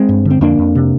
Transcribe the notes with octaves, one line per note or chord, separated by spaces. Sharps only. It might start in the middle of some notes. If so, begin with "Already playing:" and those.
Already playing: G#3 C4
G2
D3
C4
F2 A#3 D4
F2
C3